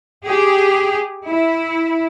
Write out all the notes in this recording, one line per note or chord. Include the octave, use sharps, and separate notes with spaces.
G4 G#4
E4